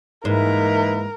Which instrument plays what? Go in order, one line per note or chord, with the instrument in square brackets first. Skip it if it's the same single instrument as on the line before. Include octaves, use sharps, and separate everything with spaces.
[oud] G#2 [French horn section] E3 A#3 D#4 [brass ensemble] E4 B4 [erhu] A#4